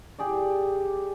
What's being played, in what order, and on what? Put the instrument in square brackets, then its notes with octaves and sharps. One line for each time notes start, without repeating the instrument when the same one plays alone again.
[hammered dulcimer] G4 G#4 D5